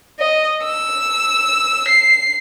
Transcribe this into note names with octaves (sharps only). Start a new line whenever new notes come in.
D#5
E6
C7